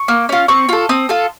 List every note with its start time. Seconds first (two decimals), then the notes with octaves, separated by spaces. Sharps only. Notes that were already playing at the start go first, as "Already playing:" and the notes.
Already playing: C#6
0.08 A#3
0.29 C#4 F4
0.48 C4 C#6
0.69 F4 A4
0.89 C4 D#6
1.09 F4 A4